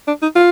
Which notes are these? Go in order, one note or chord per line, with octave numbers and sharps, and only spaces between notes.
D4
D#4
F4